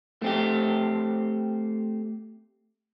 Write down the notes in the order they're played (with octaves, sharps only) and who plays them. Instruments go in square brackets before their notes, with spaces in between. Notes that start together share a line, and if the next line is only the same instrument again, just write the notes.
[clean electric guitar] A3 C4 G4